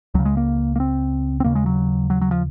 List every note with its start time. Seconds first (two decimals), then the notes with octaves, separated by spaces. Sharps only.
0.14 C#2 C#3 F#3
0.25 G#3
0.37 A#3
0.76 A#3
0.80 C4
1.40 C4
1.44 D#2 C#3 A#3
1.55 G#3
1.66 F#3
2.10 F#3
2.21 F#3
2.31 F3